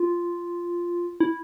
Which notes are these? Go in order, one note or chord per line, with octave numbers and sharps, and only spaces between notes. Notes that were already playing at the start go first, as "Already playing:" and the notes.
Already playing: F4
E4